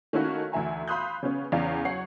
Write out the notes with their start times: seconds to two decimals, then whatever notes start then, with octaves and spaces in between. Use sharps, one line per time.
0.13 D#3 A3 A#3 C#4 E4 F#4
0.52 D2 E3 E5 G#5 A#5
0.88 F5 B5 C6 D#6 F#6 G6
1.23 C#3 B3 C#4
1.52 E2 C#3 C#4 D5 F5
1.85 F#3 C#5 F#5 C7